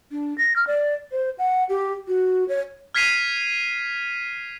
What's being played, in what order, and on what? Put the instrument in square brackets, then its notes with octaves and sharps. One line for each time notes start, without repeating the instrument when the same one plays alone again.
[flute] D4
A#6
F6
D5
C5
F#5
G4
F#4
C#5
[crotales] F6 G#6 B6 C7 D#7 F7